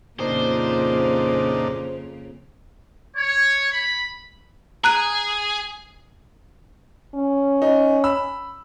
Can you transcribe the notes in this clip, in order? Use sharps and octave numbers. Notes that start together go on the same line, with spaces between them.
F2 A#2 C#3 A#3 D4 D#4 C5
C#5
B5
G#4 A#5 F#6 D#7
C#4
D#4
B5 E6